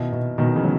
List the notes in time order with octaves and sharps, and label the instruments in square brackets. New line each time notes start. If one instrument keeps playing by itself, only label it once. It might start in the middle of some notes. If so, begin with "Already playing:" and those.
Already playing: [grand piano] B2 E4 [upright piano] D#3
[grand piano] B2
[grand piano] B2 [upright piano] D#3 F#3
[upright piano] C#3 E3
[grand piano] F#3